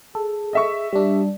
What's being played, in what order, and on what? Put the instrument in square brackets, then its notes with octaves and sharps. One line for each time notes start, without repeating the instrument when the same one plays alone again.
[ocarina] G#4 [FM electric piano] A4
[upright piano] D#5 E5 C#6
[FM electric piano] G3 D4 [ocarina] G4